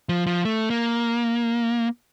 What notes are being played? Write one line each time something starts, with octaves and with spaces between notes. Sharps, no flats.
F3
F3
A3
A#3